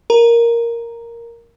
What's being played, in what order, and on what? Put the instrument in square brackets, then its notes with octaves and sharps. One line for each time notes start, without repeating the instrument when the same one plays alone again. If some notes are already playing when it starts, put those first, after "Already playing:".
[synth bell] A#4 A#5